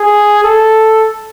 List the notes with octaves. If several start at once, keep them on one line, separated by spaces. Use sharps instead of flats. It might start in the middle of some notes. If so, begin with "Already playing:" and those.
Already playing: G#4
A4